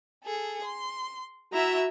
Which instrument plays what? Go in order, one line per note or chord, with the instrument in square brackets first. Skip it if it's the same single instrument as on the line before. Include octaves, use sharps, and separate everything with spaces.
[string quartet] G#4 A4
C6
[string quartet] E4 E5 A#5 [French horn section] F#4